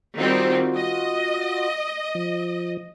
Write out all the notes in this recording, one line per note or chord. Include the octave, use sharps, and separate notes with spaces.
D#3 G3 C4 F4 F#4
D#5
F3